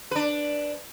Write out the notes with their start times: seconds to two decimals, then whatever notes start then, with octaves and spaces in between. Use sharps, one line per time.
0.11 D4 B4